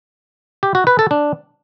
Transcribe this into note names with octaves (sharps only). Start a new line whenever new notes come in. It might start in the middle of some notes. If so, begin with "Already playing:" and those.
G4
F#4
B4
A4
D4